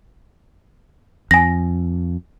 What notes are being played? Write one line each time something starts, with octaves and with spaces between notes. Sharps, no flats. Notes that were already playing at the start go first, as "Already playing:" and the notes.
F2 G#5 A#6